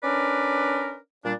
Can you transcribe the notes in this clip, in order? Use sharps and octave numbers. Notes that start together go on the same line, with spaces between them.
C#4 D4 A#4 B4 D5
A#2 G3 D4